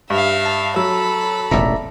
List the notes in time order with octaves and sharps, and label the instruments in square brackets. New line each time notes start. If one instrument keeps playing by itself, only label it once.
[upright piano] G2 [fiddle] E5 F5
[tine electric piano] A5
[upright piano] F#3 [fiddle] A4 B5 [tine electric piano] E6
[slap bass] E1 A1 A#2 [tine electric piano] D5 E5 A#5